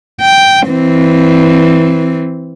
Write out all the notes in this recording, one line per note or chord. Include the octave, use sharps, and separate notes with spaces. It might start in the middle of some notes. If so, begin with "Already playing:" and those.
G5
E3 C4